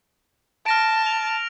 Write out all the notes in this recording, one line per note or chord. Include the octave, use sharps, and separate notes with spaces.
A5 F6 A#6 D7
F7